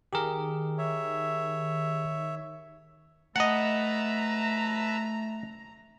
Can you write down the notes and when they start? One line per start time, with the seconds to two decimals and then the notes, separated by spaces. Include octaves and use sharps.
0.13 D#3 G4 G#4 A#4
0.78 C#5 E5
3.36 A3 B4 D#5 E5 F#5 A5 A#5